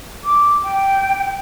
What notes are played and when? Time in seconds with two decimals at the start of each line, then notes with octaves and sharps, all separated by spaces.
0.24 D6
0.63 G5